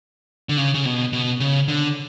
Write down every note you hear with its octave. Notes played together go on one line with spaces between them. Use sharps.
D3
C#3
C#3
B2
B2
C#3
D3